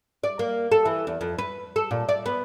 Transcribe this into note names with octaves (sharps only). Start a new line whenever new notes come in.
D5
A#3
A4
E3
E2
F2
B4
A4
A#2
D5
B3